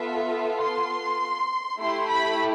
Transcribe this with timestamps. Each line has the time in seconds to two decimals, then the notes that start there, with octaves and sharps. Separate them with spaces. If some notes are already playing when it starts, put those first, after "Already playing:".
Already playing: B3 F4 A4 E5
0.60 C6
1.79 A3 E4 G4 C6
2.09 B5